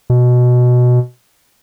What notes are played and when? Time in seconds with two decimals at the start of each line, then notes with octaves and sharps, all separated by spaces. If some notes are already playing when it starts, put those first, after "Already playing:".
0.10 B2